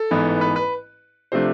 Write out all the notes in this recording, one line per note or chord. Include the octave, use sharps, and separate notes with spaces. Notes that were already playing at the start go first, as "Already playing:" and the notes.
Already playing: A4
A1 G#2 E3 B3
B4
B4
C3 F3 A3 D4 C5